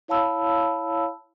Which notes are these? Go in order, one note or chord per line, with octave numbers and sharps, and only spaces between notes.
E4 C#5 F5 A5 B5 E6